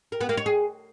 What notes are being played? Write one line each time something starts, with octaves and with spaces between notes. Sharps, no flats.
A#4
B3
A#3
C#5
G#4